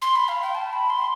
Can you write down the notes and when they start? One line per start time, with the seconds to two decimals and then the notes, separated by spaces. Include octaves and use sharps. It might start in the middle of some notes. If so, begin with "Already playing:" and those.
0.02 C6
0.16 B5
0.28 F5
0.42 G5
0.55 A5
0.73 B5
0.90 C6